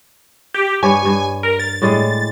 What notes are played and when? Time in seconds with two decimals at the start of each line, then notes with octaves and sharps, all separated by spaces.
0.54 G4
0.83 G2 G4 C#5 G#5
1.05 G2
1.43 A#4
1.59 A6
1.82 A2 G3 G#3